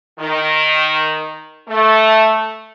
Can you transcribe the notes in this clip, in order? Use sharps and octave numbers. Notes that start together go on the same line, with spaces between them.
D#3
A3